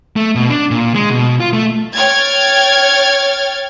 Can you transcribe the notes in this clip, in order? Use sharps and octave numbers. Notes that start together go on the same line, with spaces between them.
A3
B2
D4
A#2
G#3
B2
F4
A3
C#5 G5 F6 G#6 A6